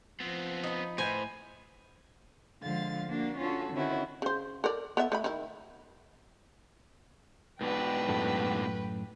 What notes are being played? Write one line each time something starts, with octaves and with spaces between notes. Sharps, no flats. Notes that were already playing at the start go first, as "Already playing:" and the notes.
F3 B3 C4
D#4 B4
A2 B4 C5 G#5
D3 F3 G#3 F5 A6
A#3 D4 F#4
C#4 D4 F4 F#4 A4
D3 D#3 C4 C#4 E4 F#4
C#3 C5
A4 A#4 D5
B3 A4 E5
A3 D#5 B5
D#3 E4
G#2 B2 D4 B4 G5
F#2 A2 A4